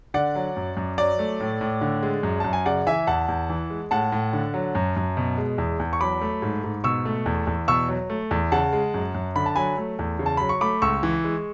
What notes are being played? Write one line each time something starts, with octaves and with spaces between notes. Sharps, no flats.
D3 D5 F#5
F#3
F#2
F#2
F#3 D5
A3
A2
A2
D3
G#3
F#2
F#2 A5
G#5
C#3 D5 F#5
E3 E5 G#5
E2 F#5 A5
E2
E3
G#3
A2 F#5 A5
A2
D3
F#3
F#2
F#2
B2
G#3
E2
E2
C#6
F#3 B5 D6
A3
G#2
G#2
B2 C#6 E6
A3
E2
E2
B2 C#6 E6
F#3
A3
E2
C#3 F#5 A5
G#3
F#2
F#2
D3 B5
A5
F#3 G#5 B5
A3
E2
C#3
A5
F#3 B5
C#6
A3 B5 D6
C#2 C#6 E6
E3
G#3